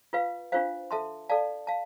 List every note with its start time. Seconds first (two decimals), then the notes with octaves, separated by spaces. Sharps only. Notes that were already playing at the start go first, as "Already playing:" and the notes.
0.13 F4 B4 F5
0.52 D4 F4 C5 F5
0.91 A4 E5 A5 C6
1.29 A4 D5 F5 A5
1.67 F5 A5